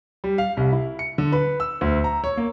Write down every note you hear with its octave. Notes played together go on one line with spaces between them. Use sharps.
G3
F5
C2
E4
C#7
D3
B4
E6
D2
A#5
C#5
A#3